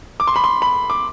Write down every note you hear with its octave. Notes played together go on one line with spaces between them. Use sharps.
D6
C6
B5
C6
B5
D6